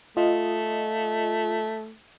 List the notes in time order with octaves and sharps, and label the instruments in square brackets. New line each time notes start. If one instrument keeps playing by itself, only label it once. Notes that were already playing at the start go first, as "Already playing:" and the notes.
[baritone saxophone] A3 [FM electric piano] F4 D#5